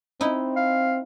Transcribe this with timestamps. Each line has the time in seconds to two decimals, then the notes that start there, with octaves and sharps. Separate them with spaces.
0.21 C4 D#4 E4
0.56 F5